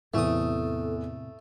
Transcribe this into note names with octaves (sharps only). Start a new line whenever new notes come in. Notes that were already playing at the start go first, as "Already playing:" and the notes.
E2 A2 C3 A3 A4 D#6